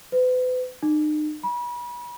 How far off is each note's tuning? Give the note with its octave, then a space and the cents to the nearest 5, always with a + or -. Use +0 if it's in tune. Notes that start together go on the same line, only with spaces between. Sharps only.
B4 +40
D#4 -40
B5 -35